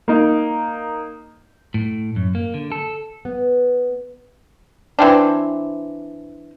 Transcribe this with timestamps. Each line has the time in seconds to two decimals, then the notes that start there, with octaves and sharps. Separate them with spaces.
0.08 A#3 D#4
1.74 A2
2.16 F#2
2.35 A#3
2.54 D3
2.72 A4
3.25 B3
4.99 E3 C4 D4